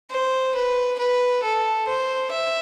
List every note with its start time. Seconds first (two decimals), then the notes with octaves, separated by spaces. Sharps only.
0.11 C5
0.55 B4
0.99 B4
1.44 A4
1.88 C5
2.31 E5